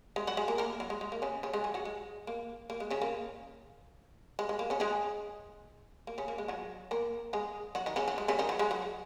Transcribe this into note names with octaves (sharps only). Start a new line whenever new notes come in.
G#3
F#3 F#4
G#3 G#4
A#3 A#4
A#3 A#4
F#3 F#4
G#3
G#3
A#3
C#3 C#4
C#3 C#4
G#3 G#4
F#3 F#4
F#3 F#4
G#3
A#3
A#3
G#3
C#3 C#4
A#3
G#3
G#3
A#3
C#3 C#4
G#3 G#4
A#3
C#3 C#4
A#3
G#3
F#3 F#4
A#3 A#4
G#3 G#4
F#3 F#4
D#3 D#4
C#3 C#4
F#3
G#3
C#3 C#4
D#3 D#4
F#3 F#4
G#3 G#4
F#3 F#4